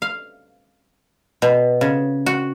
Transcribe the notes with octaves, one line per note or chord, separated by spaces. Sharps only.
F5
B2
C#3
F#4